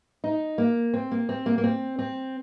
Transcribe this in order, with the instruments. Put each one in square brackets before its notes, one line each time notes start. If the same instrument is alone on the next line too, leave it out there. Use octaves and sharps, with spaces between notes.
[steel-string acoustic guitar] D#4
A#3
C4
A#3
C4
A#3
A#3
C4
C4